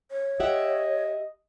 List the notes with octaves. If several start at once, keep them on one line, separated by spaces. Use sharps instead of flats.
C#5
G4 D#5 E5 F#5